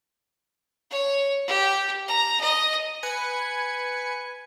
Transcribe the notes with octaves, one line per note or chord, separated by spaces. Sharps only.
C#5
G4
A#5
D#5
B4 G#5 C#7